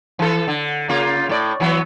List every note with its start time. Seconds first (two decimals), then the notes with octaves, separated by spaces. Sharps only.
0.19 E3 A4
0.48 D3
0.89 C#3 A#3 F4
1.29 A2 D5
1.60 E3 F#3 B3